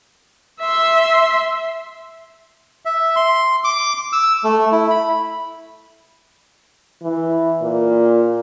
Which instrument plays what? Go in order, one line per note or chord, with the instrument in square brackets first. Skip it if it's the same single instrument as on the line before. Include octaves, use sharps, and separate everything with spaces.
[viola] E5 C6
[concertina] E5
C6
D6
E6
A3
E4
B5
[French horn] E3
A#2